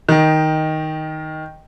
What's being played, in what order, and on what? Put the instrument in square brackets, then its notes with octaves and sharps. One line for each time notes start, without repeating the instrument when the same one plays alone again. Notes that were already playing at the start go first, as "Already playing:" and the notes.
[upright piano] D#3 [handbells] D#5 G5